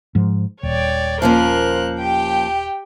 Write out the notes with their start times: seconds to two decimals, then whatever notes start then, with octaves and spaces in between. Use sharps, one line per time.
0.15 G#2 F3
0.63 D#1 C#5 D5 G5
1.22 F3 A#3 C#4 A#4 C5 F#6
1.98 G4 G5